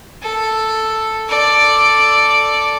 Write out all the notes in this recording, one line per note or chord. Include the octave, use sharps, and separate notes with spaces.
A4
A4 D5